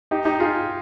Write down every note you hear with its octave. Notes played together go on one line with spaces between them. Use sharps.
D#4 G4
D#4 G4
F4 G#4